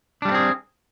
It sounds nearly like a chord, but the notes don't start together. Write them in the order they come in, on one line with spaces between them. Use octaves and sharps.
D4 G3 A3 C4 G#4